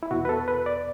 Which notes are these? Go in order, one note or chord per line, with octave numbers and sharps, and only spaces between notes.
E4
E2 B2 F#4
B4
A4
B4
D5